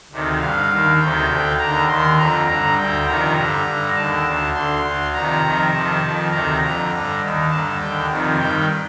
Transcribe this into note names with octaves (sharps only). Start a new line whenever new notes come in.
D2 C3 D#3
G2 D3 F5
D#2 D#3
D2 C3 D#3 G5
D2 D3
D#2 D3 A#5
D#2 D#3 C6
F2 D3 A#5
G2 D3 A#5
D2 D3 G5
F2 C3 D#3 A#5
G2 D3 A#5
G2 D3
D#2 D3 A5
D2 D3
D2 D3 C6
D2 D3
F2 C3 D#3 A#5
F2 C3 D#3
F2 C3 D#3 A5
F2 D#3
D2 C3 D#3 A#5
F2 D3 A#5
G2 D3
D#2 D#3
G2 D3 A5
D#2 D3 G5
F2 C3 D#3
G2 D#3 G5